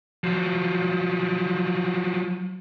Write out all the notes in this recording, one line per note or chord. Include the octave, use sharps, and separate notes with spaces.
F3 F#3